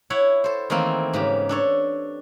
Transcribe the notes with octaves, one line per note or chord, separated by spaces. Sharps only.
E4 C#5 F#5
A4 C5
D#3 E3 A3 A#3 C4
G#2 C#3 G4
D4 A4 C#5